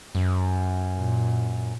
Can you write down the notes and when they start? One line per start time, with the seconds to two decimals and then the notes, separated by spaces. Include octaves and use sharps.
0.15 F#2
0.97 A#2